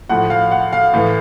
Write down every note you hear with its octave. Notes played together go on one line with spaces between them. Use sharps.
A2 F3 F#5
F5
F#5
F5
A2 E3